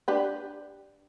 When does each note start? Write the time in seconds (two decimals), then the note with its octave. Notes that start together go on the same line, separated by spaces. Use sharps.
0.08 D4 G4 B4